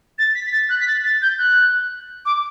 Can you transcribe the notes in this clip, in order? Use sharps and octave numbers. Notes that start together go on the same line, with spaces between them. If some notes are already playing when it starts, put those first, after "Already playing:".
A6
B6
B6
A6
F#6
B6
A6
A6
G6
F#6
D6